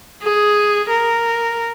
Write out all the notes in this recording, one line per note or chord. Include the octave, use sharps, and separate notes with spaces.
G#4
A#4